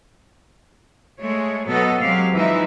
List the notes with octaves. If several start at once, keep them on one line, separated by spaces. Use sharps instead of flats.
G#3 A3 C#5
B2 F#3 B3 F#4 A4 D#5
F#3 G#3 C4 G4 F5
E3 F3 G#3 D#4 E5